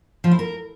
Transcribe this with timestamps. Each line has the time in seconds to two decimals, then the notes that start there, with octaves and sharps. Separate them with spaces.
0.24 F3
0.31 E4
0.39 A#4